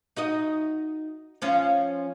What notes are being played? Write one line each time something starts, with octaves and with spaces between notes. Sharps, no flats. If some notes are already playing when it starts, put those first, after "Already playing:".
D#4 F#4 D#5
F3 C#4 F4